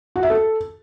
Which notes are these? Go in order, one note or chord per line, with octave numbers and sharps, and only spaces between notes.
F#4
E5
A4